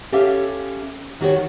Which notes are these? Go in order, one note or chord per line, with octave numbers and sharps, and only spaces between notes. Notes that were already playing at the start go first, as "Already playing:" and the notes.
C#4 G4 A4 E5 F5
D#3 F#4 G4 C#5